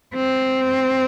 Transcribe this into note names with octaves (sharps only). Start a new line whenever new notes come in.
C4